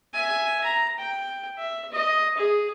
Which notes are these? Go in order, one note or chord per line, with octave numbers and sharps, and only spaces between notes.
E5 G#5
A#5
G5
E5
D#5
G#4